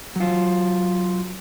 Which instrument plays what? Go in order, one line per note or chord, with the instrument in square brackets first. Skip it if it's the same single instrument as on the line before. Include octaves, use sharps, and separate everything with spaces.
[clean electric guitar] F#3 F4